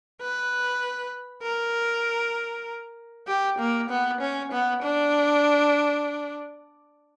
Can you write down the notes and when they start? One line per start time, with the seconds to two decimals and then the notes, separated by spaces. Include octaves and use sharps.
0.21 B4
1.43 A#4
3.28 G4
3.59 A#3
3.89 B3
4.21 C#4
4.52 B3
4.82 D4